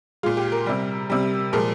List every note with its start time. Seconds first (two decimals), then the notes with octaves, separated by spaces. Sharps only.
0.23 A#2 G#3 F4
0.37 G4
0.52 A#4
0.66 C3 G3
1.10 C3 G3
1.53 A#2 F3 G#3 A#4